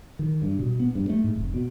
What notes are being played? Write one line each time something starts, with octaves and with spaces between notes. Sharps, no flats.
D#3
G2
B2
B3
G2
A3
G#2
F1
B2